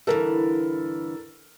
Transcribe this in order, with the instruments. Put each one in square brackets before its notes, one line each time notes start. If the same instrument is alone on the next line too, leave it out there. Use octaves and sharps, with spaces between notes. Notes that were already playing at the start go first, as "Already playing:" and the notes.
[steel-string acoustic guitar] G2 D3 E3 [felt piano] A4 A#4